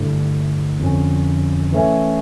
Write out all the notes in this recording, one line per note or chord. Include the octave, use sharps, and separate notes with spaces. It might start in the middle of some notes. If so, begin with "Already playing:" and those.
Already playing: G2 D3 A3 E4
F2 D3 F3 C#4
E3 A3 C#4